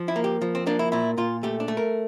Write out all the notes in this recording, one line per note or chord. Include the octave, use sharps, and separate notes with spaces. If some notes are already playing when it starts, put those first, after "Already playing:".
Already playing: F3
E4
A#3
G4
F3
C4
A#3 D4
E4
A#2 E4
A#2 F4
A3 G4
D4
A3
A#4